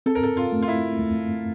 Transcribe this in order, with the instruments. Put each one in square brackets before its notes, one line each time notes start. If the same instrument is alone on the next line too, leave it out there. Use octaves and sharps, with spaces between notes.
[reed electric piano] C4 [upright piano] A4
[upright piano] A#4
A4
F4
[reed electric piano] A3
[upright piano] F4
E4
[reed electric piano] A3